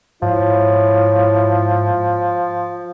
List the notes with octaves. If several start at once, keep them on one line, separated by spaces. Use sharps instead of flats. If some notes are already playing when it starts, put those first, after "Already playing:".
G#2 F3 E4 C#5